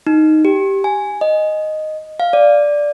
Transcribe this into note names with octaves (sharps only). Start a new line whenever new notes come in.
D#4
G4
G#5
D#5
F5
D5